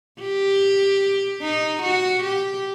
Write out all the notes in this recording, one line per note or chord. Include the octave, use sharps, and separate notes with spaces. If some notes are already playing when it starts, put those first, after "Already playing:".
G4
D#4
F#4
G4